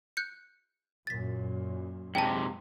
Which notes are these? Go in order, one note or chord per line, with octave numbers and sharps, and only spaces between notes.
F#6 G6 C#7
F#2 A#2 A6 B6
G#2 C3 G5 A5